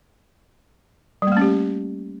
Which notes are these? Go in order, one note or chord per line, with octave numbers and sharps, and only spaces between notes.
G3 A3 A#3 C#4 G4